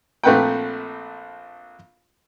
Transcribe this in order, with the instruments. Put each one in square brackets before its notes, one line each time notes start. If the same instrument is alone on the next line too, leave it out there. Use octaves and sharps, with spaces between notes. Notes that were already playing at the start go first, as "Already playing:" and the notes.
[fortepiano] A#1 A3 C4 B4 F#5 G5